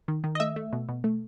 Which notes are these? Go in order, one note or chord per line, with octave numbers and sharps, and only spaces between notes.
D#3
D#3
D#5
A3 E5
A3
B2
B2
A3